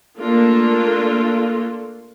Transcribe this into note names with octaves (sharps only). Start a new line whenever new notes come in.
A3 A#3 D4 F4 A4